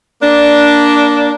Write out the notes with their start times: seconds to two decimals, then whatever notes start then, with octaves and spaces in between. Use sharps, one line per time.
0.23 A#3 D4